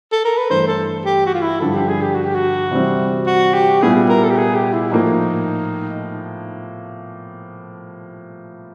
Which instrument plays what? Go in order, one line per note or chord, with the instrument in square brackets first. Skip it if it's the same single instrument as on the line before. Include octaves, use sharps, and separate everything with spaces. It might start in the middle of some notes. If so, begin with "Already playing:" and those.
[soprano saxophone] A4
A#4
B4
[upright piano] G2 E3 A3 [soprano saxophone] C5
[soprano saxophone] A4
G4
F#4
F4
E4
[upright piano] G2 D3 F3 [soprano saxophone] A4
[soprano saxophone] G4
G#4
G4
F#4
G4
F#4
[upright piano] C3 E3 G3 C4
[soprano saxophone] F#4
G4
[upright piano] A#2 G3 B3 E4 [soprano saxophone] G#4
[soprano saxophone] A#4
A4
G4
G#4
G4
E4
[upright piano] A2 F3 A#3 [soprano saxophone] D#4